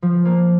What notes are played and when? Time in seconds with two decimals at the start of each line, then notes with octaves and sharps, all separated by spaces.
0.02 F3
0.25 A#3